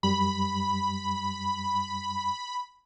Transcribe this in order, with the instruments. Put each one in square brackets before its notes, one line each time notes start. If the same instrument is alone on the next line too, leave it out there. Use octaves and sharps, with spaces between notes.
[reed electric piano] F#2 G3 [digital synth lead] B5